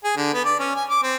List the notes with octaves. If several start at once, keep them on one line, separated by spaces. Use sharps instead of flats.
G#4
D3
B3
D5
C#4
G#5
D6
C4